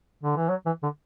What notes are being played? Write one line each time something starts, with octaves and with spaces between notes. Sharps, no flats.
D3
E3
F#3
E3
D3